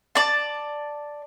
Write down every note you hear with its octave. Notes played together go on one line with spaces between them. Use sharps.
D5 A5